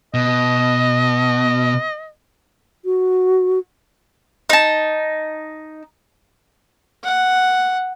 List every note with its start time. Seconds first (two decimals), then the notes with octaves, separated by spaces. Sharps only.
0.14 B2 D#5
2.85 F#4
4.50 D#4 A5
7.04 F#5